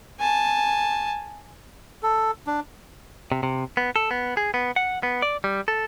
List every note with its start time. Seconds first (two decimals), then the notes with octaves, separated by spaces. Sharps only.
0.19 G#5 A5
2.03 A4
2.47 D4
3.32 C3
3.43 C3
3.77 B3
3.96 A4
4.11 B3
4.37 G#4
4.54 B3
4.76 F#5
5.03 B3
5.22 D5
5.44 G3
5.68 A4